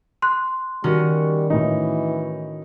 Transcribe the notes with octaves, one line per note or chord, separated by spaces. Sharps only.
C6 F#6
D#3 G3 C#4 F#4
A2 E3 D#4